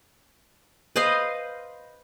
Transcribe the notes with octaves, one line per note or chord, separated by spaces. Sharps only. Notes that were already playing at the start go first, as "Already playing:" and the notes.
B4 C5 D#5 F5